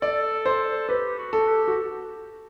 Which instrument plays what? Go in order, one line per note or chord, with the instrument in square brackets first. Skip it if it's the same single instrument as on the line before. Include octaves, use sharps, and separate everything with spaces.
[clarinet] A4 [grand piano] D5
[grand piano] C5
[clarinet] G4 [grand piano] B4
[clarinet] F#4
[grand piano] A4
[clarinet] G4
[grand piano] F#4